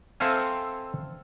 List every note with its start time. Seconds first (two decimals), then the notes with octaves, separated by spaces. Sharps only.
0.20 C4 A4 E5 F5 G#5